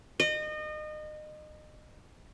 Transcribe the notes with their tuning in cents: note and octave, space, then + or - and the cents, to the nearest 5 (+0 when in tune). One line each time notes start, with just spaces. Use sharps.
D#5 -30